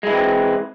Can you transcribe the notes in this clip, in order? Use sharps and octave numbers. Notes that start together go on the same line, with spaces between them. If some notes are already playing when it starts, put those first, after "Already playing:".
E3 G#3 C4 E4